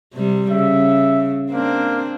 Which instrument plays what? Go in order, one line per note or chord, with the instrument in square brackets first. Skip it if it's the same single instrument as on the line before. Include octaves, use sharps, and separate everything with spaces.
[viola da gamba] C3 G3
[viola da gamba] C#3 [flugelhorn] E5
[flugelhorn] A#3 [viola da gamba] C4 D4